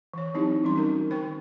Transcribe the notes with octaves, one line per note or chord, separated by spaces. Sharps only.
E3 C#5
F#3 C4 D#4 E4 G4
E3 G3 C#4 C6
C#4 D#4 F#4 A#4
D#3 C5 G5 C#6